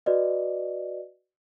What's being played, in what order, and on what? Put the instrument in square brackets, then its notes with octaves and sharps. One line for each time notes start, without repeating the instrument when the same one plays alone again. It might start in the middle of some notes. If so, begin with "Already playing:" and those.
[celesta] F#4 B4 D5 D#5